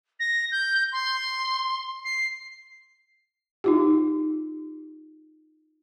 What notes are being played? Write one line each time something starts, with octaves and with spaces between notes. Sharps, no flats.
A#6
G6
C6
C7
D#4 F4 G4